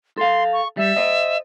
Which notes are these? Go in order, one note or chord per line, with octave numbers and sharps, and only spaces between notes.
A4 F5 C6
C#6
G3 E5
C5 D#5